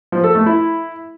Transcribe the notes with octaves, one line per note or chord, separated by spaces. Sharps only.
F3
A4
A3
E4